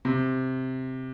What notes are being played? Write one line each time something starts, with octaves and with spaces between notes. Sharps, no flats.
C3